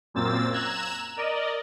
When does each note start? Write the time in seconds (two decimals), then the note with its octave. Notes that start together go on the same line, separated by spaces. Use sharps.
0.14 F#2 A#2 A#3 C4 E6 A6
0.52 A#5 E6 F#6 G#6 E7
1.17 A#4 D5 D#5